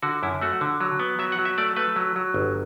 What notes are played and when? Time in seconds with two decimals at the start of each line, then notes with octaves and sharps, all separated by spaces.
0.02 D3 F#4
0.23 F#2 E4
0.42 A3 F#4
0.61 D3
0.80 F#3
1.00 B3
1.19 F#3 E5
1.32 F#5
1.39 F#3
1.45 E5
1.58 A3 D5
1.76 A3 B4
1.96 F#3
2.16 F#3
2.34 G1